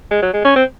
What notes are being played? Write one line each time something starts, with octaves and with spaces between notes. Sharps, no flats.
G#3
F#3
G#3
C#4
C4